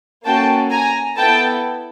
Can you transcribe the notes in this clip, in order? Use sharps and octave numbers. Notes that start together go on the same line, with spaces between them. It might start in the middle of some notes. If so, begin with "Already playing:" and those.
A#3 C#4 F#4 A4 G5 A5
G#5 A#5
B3 E4 A4 G5 A5